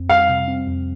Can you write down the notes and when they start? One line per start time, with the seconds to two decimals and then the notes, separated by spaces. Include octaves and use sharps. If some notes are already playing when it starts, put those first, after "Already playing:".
Already playing: F2 C4
0.09 G3 F5
0.29 C3
0.48 C4
0.67 F2